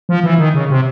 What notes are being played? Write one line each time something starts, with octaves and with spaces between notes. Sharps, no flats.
F3
E3
D#3
C#3
C3